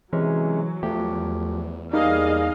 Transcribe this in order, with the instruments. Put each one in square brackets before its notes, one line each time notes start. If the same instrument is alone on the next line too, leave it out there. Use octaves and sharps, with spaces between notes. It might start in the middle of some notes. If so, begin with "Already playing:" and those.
[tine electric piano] C3 G#3 C#4 [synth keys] E3 [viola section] F#3
[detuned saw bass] E2 [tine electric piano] F3 G4 [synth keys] A3
[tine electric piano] G3 A#3 [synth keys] D#4 [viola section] G#4 D#5 F5